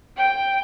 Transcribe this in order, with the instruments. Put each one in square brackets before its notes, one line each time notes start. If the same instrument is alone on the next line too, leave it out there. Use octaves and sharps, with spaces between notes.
[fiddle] G5